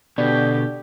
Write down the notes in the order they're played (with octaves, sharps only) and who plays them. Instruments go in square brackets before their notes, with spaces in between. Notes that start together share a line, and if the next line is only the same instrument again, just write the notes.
[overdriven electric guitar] B2 [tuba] D3 [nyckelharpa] G4 [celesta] D5